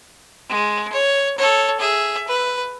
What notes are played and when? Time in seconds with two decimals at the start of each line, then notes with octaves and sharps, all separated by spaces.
0.49 G#3
0.93 C#5
1.38 A4 C#5
1.79 G#4 E5
2.28 B4